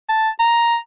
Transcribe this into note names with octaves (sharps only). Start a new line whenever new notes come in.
A5
A#5